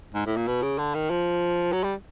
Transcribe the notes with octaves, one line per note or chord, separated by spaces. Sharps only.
G#2
A2
A#2
B2
C#3
D3
D#3
F3
F#3
G3